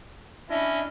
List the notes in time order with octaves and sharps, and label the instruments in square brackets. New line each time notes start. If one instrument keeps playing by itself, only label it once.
[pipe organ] C#4 D#5 [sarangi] D4 [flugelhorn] E4